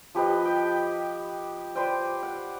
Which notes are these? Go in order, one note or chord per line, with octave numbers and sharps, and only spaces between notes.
F3 G4 B4 D#5
G5
B4 C5 D5 G5
F#5